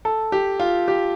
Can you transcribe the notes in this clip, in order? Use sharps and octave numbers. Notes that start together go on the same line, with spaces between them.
A4
G4
F4
G4